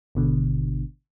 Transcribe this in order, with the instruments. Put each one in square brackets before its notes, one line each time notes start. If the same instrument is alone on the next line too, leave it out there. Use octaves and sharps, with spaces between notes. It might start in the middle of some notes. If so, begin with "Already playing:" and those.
[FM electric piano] G#1 B2 D3